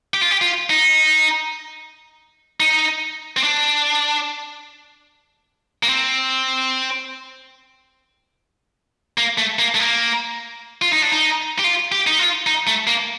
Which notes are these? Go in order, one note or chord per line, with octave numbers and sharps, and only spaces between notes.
G4
F4
G4
F4
D#4
D#4
C4
D4
A#3
C4
A#3
A3
A#3
A3
A#3
F4
D#4
D4
D#4
G4
F4
G4
D#4
F4
D#4
A3
A#3